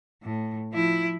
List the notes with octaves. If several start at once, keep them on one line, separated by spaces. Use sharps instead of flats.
A2
F3 E4